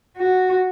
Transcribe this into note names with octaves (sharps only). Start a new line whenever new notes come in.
F#4